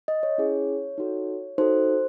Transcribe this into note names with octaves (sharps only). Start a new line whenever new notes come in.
D#5
C#5
C#4 E4 G#4
D#4 F#4 A4
D#4 F#4 A4 C5